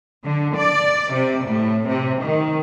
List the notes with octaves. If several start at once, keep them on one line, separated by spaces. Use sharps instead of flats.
D3
D5
C3
A2
C3
D#3